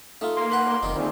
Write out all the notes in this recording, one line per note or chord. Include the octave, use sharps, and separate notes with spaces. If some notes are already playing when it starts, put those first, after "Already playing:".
A3 D#4 F4
A#3 C6
B4 F#5 B5
A#4 D5
F1 D#3 D#4
A#2 D#3 G#3 A3 C4